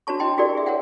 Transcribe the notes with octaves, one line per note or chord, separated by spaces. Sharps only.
D4 F#4 C#5 A5 C#6
E4 F#4 D#5 G5 A5 C6
E4 F#4 G4 A4 A#4 D5
G#4 E5
A#4 C#5 E5 F#5 G5